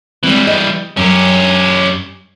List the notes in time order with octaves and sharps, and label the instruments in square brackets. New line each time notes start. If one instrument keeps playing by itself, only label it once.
[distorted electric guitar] E3 G3 [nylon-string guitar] G#3 C4
[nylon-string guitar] D#5
[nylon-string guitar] F#2 [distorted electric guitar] C#4 G4